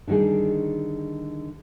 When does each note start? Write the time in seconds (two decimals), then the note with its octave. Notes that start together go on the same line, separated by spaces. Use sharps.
0.07 D3 D#3 G3 D#4 G#4